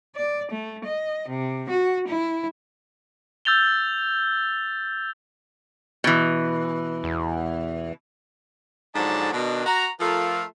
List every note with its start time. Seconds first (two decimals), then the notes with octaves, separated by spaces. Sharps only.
0.16 D5
0.51 A3
0.85 D#5
1.29 C3
1.70 F#4
2.08 E4
3.45 E6 G6 A6 F7 G7
6.04 B2 E3
7.04 E2
8.95 G#2 D3 F3 F#3 D5 A5
9.33 B2 D#3 D4
9.65 F#4 A#5
10.00 F3 A3 F4 A4 A#4